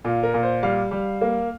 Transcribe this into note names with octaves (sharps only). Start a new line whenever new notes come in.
A#2 F4
A#4
A#2
C5
G3 F5
G3
A#3